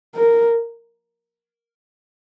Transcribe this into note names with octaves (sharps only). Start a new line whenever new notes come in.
A#4